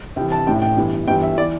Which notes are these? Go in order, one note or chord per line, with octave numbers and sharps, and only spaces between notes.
C2 C3 E3 G5
A5
A1 A2 E3 G5
G5
G1 G2 E3
G1 G2 E3 G5
E5
E3 D5